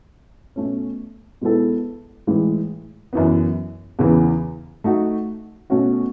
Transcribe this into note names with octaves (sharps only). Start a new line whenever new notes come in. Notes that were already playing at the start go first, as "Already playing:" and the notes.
B2 A3 C#4
B2 G#3 B3 E4 A4
A2 E3 G#3
F#2 E3 B3
E2 C#3 E3
A3 D#4 F#4
B2 A3 C#4 F#4